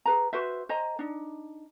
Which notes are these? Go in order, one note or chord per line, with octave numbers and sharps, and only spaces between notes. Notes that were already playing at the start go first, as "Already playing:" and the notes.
G#4 B4 A#5
F#4 B4 C5 E5
C5 D#5 G#5 A#5
D4 D#4